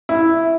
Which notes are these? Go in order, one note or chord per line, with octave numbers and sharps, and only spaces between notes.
E4